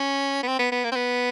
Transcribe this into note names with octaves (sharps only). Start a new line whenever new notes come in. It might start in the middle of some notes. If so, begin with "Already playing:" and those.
Already playing: C#4
B3
C4
B3
B3
A#3
C4
B3